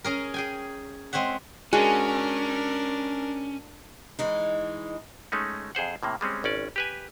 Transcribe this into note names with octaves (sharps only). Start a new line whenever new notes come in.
C#4 G#4 A#4
G#4 G5 G#5
G#3 C4 C#5 E5 F#5
G#3 C#4 D4 F#4 G#4 A#4
E3 G#3 D#4
G#3 A3 C#4 D#4
F2 G#4 C5 F#5
A2 C3 A#3
G3 G#3 C4 C#4
G#1 C#4 D5
G4 B4 G#5